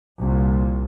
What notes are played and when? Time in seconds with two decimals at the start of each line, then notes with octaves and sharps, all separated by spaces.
0.20 C2 A#2